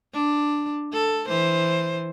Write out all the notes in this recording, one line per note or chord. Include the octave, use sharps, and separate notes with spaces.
D4
A4
E3 C5